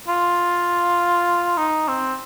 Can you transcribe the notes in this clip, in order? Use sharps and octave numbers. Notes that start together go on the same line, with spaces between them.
F4
D#4
C4